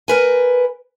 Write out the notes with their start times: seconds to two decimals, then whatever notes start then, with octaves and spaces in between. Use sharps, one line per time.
0.08 A#4 B4 G#5